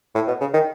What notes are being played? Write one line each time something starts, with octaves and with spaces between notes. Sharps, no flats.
A2
B2
C#3
D#3